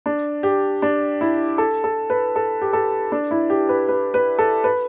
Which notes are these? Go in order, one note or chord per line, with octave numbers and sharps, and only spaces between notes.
D4
G4
D4
E4
A4
A4
B4
A4
G4
A4
D4
E4
G4
B4
B4
B4
A4
B4